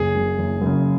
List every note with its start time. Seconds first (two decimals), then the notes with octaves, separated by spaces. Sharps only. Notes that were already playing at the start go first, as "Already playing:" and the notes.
Already playing: F#1 G#4
0.15 F#2 C#3
0.38 F#1
0.61 F#2 C#3